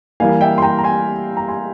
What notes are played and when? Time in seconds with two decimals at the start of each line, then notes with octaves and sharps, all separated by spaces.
0.20 E3 G3 A#3 F5 G#5
0.41 E5 G5
0.58 C6
0.62 G5 A#5
0.79 A#5
0.84 G#5 C6
1.37 A#5
1.48 G#5 C6